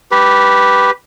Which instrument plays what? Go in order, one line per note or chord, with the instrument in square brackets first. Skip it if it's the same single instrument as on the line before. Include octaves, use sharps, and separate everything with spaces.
[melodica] G4 B4